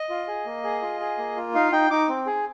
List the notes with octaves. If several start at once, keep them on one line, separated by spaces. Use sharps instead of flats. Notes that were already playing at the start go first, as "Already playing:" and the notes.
Already playing: D#5
F4
G#4
A#3
G#4
F4
G#4
A#3
F4
D#4 F5
D#4 G5
D#4 D6
C4
G#4